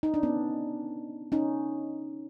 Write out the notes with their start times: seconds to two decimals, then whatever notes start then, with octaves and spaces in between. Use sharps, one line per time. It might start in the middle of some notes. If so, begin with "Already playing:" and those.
0.03 D#4
0.14 D4
0.23 B3 C#4
1.32 C#4 D#4